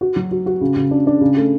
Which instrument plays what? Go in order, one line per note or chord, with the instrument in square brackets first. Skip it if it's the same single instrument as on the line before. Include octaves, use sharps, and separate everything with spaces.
[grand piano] F#4
F#3
F#4
F#4
C#3
C#3
D4
D4
C#3
A3